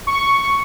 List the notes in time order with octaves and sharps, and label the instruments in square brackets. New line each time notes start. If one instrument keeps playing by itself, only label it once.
[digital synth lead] C#6